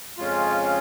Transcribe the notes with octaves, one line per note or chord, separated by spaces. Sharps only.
F2 C#3 G#3 C#4 F4